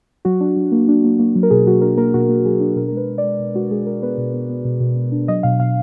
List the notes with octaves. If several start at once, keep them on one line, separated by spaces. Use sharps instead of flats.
F#3 F#4
D4
F#3
A#3
D4
A#3
A#3
F#3
A#4
B2 G#4
F#3 F#4
D4 A#4
A#3 A#4
B2 F#4
A#3
F#3 G#4
D4
B2 A#4
A#4
G#3 B4
G#3
D5
G#3
B2
G#3 F#4
G#3 G#4
G#3 A#4
B3 B4
B2
B3
B3
B2
B2
B2
D4
F#3 D#5
B2 F5
B2 F5